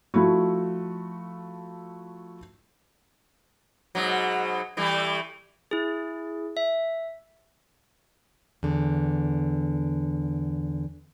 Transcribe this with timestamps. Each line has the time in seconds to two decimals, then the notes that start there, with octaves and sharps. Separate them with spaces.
0.14 F3 A3 E4 F#4
3.95 G#2 B2 F#3
4.77 E3 G3 A3
5.71 E4 G#4
6.57 E5
8.63 E2 D3